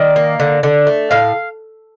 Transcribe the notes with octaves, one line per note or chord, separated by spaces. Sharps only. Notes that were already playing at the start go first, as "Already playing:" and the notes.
Already playing: D#3 D5
A#3
D3
D3
A3
A2 F5